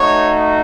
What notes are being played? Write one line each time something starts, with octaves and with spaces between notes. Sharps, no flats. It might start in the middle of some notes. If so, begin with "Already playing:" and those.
Already playing: A3 D#4 F#4 C#5